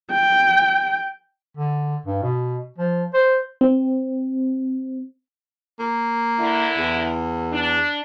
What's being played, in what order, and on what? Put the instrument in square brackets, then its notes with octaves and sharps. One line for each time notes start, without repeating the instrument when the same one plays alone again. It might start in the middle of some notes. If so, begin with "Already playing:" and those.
[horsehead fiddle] G5
[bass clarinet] D3
G2
B2
F3
C5
[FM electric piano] C4
[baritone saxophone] A#3
[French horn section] D3 E4
[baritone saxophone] E2
[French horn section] D4